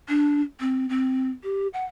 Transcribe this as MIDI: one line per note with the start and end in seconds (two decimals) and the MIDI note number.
0.09 0.41 62
0.60 0.89 60
0.89 1.30 60
1.44 1.68 67
1.74 1.85 78